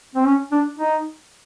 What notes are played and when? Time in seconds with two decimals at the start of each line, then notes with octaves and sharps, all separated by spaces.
0.15 C4
0.26 C#4
0.52 D4
0.79 D#4